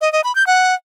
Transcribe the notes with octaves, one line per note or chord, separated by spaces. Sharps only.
D#5
D#5
B5
G6
F#5